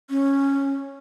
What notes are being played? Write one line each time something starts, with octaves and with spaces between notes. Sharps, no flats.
C#4